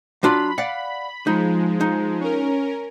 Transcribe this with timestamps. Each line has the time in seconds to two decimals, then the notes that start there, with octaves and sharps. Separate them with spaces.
0.23 F#3 D4 F4 B5
0.58 D5 F5 F#5
1.27 F3 G#3 D#4
1.81 D#4
2.21 C#4 A#4